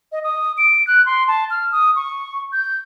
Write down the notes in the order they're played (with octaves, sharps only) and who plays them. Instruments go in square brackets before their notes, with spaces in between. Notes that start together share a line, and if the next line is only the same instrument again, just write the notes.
[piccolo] D#5
D#6
D7
F#6
C6
A5
F6
D#6
C#6
G6